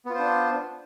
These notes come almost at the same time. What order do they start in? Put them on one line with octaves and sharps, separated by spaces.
B3 F4 C5 D4